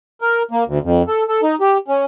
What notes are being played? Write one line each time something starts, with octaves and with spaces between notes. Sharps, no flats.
A#4
A#3
D2
F2
A4
A4
D#4
G4
C#4